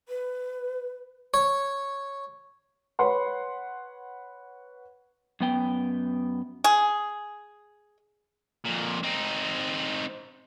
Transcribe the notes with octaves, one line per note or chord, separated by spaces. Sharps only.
B4
C#5
B4 C#5 F#5 C6
F#2 B3 G5
G#4
F2 A#2
C4 D#4